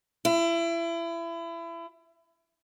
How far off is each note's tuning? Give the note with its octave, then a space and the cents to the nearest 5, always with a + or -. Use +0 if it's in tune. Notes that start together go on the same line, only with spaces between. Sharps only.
E4 +30